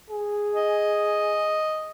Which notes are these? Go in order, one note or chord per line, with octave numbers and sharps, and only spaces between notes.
G#4
D#5